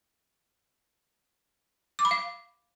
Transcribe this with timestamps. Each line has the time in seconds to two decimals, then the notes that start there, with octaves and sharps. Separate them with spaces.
1.99 D6
2.05 B5
2.11 F5